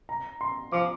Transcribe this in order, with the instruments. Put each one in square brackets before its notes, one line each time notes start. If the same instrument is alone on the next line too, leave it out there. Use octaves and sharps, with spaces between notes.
[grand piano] A#5
C6
[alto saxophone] F3 [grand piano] D6